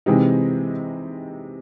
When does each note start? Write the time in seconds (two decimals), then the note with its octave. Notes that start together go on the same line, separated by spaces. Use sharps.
0.06 C3 E3 G#3 C4 D#4